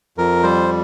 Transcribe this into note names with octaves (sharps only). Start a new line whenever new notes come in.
F2 A#4
G3 C5